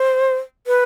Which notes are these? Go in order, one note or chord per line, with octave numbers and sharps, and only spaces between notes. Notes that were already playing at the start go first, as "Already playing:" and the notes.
Already playing: C5
B4